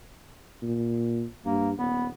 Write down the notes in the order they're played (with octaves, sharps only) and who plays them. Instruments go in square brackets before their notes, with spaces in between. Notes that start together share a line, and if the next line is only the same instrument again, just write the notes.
[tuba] A#2
[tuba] G2 [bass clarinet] A#3
[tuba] D#1 [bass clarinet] B3